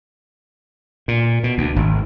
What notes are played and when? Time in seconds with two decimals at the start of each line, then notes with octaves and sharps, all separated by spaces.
1.08 A#2
1.44 B2
1.58 D2
1.76 G#1